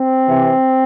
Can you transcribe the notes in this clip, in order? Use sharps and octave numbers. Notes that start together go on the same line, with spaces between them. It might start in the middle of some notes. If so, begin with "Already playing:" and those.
Already playing: C4
C3 E3